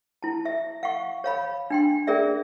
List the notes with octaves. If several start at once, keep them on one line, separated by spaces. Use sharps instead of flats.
E4 A5
E5
F5 F#5 C#6
C#5 F5 B5
D4 G5 C6
C#4 G#4 A#4 D5 E5